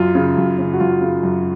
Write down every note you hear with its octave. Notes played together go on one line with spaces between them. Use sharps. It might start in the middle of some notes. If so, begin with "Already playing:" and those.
Already playing: F#2 F4
C#3
F#2
C#3
F#4
F#2 F4
C#3
F#2